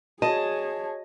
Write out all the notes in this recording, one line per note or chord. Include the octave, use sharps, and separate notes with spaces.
F#4 G#4 C#5 D#5 A5